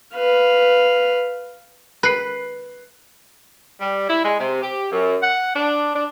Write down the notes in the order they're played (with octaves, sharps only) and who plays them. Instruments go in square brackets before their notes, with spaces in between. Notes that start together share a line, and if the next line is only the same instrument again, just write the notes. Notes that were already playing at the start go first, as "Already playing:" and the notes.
[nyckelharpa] B4 F5
[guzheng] B4 [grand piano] F#6 C7
[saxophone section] G3
E4
G#3
C3
G4
F#2
F#5
D4
D4